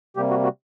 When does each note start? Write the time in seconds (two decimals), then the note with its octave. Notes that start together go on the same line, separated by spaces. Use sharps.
0.16 C3 G3 A#3 G4
0.30 F#4
0.44 F#4